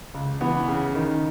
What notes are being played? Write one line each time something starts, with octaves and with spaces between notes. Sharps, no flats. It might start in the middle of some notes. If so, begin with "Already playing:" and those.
C#2
E3 B3
C#3
D#3